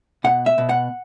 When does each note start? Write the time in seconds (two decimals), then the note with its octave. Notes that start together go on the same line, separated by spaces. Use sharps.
0.24 B2 F#5
0.46 E5
0.58 B2
0.69 F#5